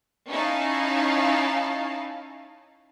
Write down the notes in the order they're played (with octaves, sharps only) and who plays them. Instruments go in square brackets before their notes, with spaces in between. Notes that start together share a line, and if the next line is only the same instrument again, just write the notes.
[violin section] C#4 D#4 E4 F5 A5